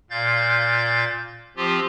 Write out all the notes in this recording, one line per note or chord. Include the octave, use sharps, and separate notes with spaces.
A#2 F5 G6 A6
F3 C4 F4 G4